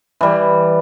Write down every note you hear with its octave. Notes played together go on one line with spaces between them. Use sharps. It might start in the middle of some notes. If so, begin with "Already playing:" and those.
E3 G3